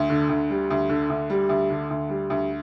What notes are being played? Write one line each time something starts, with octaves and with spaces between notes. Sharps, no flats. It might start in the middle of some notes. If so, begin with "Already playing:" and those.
Already playing: D2
D3
D2
G3
D2
D3
D2
G3
D2
D3
D2
G3
D2